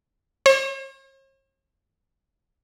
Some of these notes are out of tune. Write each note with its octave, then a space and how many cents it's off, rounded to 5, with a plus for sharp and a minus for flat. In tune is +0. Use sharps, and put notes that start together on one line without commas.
C#5 -45